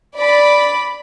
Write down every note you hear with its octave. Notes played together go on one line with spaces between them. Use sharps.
D5 B5